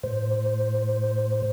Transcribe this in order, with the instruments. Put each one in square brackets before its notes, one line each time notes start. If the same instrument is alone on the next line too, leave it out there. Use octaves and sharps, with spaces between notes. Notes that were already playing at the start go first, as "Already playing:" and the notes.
[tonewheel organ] A2 C5